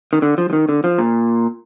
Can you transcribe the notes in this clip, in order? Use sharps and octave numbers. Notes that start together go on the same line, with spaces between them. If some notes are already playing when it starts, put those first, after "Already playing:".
D#3
D3
F3
F3
D#3
D3
F3
A#2